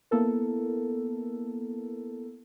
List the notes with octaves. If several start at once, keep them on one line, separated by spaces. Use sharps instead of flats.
A#3 B3 E4 A4 A#4